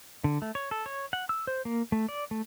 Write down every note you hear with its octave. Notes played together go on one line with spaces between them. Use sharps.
D3
A3
C#5
A4
C#5
F#5
E6
C5
A#3
A3
D5
A3